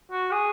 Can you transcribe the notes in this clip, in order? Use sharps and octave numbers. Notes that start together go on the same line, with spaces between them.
F#4
G#4